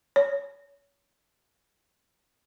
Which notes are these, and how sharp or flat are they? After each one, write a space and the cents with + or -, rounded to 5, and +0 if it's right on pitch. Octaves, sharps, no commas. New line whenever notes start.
C#5 +25